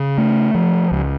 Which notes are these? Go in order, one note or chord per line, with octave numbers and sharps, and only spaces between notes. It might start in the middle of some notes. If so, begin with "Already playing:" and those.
Already playing: C#3
A3
F3
C#2